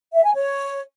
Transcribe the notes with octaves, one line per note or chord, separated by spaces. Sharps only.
E5
G#5
C#5